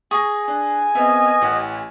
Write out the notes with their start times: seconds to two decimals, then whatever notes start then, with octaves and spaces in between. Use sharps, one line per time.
0.11 G#4 C#6 A#6
0.48 D4 G#5
0.95 B3 C4 A#4 B4 D#5 E5
1.41 A1 G4 F#5